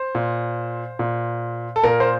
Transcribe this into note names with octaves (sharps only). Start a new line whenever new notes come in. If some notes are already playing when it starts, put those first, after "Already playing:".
Already playing: C5
A#2
A#2
A4
A#2 A#4
C5